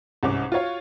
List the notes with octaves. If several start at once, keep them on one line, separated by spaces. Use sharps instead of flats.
C2 G#2 C#4 D6
F4 F#4 C#5 F5